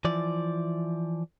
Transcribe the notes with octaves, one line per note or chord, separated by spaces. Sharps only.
E3 F3 D5